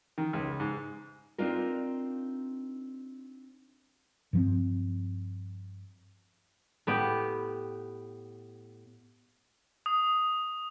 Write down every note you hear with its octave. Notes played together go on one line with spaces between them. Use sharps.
D#3
C#2
G#2
C4 D4 D#4 F4 A#4
G2 F3 C4
A2 B3 G4
D#6